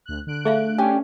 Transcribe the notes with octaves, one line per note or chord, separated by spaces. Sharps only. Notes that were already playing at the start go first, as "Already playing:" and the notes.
D2 F#6
D3 F#6 D7
A3 G#4 E5 F5
C#4 D4 G4 G#5